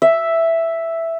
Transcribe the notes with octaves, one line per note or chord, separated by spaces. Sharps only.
E5